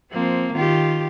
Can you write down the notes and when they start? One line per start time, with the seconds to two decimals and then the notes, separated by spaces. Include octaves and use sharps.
0.11 F3 A#3 C4
0.54 D#3 F4 G4